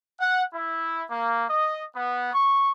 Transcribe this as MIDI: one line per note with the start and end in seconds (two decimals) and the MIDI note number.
0.19 0.42 78
0.53 1.04 64
1.11 1.45 58
1.50 1.82 75
1.96 2.33 59
2.34 2.72 85